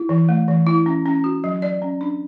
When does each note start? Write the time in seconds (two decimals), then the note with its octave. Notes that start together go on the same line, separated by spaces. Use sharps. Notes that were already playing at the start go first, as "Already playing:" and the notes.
Already playing: E4
0.09 E3
0.29 A3
0.48 E3
0.67 E4
0.86 C#4
1.06 C#4
1.24 F#4
1.44 F#3
1.62 D5
1.82 C#4
2.01 D4